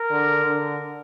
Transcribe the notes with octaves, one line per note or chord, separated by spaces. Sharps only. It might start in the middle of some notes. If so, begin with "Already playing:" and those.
Already playing: A#4
D3
D3